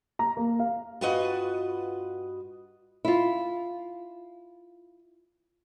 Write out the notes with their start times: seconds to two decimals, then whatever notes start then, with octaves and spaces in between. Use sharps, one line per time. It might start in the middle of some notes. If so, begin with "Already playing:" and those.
0.19 A#5
0.37 A#3
0.59 F5
1.01 G2 F4 F#4 B4 D#5 F#5
3.05 E4 F4